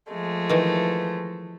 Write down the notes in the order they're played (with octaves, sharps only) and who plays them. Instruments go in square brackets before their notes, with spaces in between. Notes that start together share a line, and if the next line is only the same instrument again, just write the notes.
[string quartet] F3 G#3 A3
[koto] D#3 E3